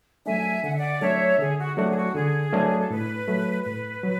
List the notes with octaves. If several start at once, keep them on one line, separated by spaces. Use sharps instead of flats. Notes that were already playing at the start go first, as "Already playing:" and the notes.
F#3 A3 D4 E5 G#5
D3 F#5
E5
D5 F#5
F#3 A3 D4 C#5 E5
D3 G#4
F#4
F#3 A3 D4 F#4
G#4
F#4
D3 G#4
F#3 A3 D4
A4
A2 B4
F#3 A3
A2 B4
F#3